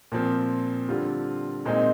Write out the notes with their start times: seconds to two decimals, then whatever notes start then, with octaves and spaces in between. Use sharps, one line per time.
0.12 A#2 F3 C4
0.89 D3 G3 C4 F4
1.65 A#2 G#3 C4 D#4